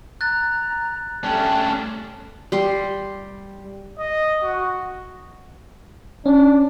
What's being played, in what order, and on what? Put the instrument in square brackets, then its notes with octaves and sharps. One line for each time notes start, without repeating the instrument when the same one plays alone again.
[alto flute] A#5 [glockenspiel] F#6 A6
[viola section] G3 A3 A5 [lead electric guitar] C#4 D4 [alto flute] G5
[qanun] G3 C6
[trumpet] D#5
F#4
[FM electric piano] C#4 [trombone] D4